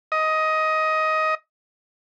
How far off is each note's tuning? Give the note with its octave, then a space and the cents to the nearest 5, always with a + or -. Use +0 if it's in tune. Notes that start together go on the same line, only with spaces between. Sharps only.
D#5 +15